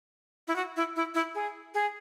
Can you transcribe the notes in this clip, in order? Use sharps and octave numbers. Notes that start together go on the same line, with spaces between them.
E4
F#4
E4
E4
E4
G#4
G#4